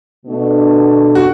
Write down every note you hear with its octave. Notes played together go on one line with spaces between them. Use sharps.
B2 A3 D4
F#4